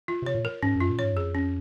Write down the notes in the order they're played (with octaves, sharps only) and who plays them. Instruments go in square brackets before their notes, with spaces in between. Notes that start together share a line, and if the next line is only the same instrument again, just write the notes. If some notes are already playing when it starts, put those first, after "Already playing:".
[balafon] F4
[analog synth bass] C3 [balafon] C#5
[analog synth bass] A#2
[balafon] A#4
[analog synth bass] G#2 [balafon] C#4
[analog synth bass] F#2 [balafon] F4
[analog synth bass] A#2
[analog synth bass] G#2 [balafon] C#5
[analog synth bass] F#2
[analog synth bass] F2 [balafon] G#4
[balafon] C#4